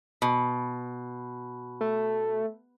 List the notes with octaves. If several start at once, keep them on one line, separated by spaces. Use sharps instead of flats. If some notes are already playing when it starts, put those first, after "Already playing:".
B2
A3